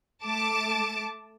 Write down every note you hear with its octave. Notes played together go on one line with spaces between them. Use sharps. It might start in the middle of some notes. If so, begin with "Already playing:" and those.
A3 A5 D6